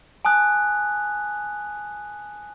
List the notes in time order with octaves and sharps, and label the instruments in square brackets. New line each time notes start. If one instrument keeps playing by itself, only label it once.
[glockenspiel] G#5 A5 D#6 F#6